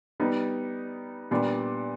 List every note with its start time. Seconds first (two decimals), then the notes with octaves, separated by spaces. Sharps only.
0.20 G3 B3 D#4
1.31 A#2 G3 B3 D4